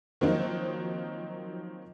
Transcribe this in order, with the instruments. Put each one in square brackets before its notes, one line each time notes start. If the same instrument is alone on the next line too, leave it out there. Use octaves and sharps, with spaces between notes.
[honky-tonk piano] D#3 F3 F#3 A#3 C4 D#4